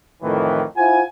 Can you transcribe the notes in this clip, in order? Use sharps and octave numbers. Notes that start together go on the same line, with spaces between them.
F2 A2 D#3 E3
E4 F4 C5 F#5 G#5